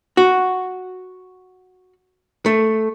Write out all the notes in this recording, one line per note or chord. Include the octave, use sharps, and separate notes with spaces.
F#4
A3